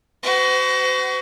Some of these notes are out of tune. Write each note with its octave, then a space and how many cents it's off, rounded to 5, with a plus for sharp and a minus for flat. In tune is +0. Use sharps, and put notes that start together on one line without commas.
F#4 +25 C5 -45